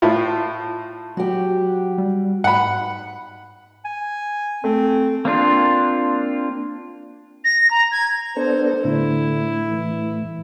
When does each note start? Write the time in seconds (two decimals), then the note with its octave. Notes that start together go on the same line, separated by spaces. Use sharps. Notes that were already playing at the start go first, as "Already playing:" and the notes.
0.02 A2 E4 F4
1.17 F#3 F#4 G4
1.98 G3
2.44 G#2 F#5 B5
3.85 G#5
4.64 A3 C4
5.25 A#3 C4 D4 F4
7.45 A#6
7.71 A#5
7.92 G#6
8.36 B3 D4 A4 C5
8.84 A2 D3 E4
9.69 E3